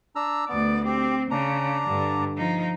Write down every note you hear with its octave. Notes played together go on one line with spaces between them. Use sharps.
D4 A#5 E6
D2 B3 D5
C4 G4
C#3 D4 A#5
G2 D3
F3 D#4